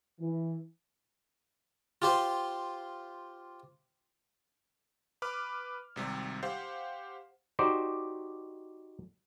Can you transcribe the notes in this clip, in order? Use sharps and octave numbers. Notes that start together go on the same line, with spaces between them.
E3
F4 G4 C5
B4 D6 F6
G#1 C3 G3
G4 C5 F5 F#5
D#4 F#4 G4 C5 D5